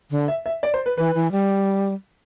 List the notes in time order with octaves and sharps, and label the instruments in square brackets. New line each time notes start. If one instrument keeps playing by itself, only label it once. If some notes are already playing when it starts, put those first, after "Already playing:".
[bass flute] D3
[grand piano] E5
E5
D5
C5
B4
[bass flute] E3 [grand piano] B4
[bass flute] E3
G3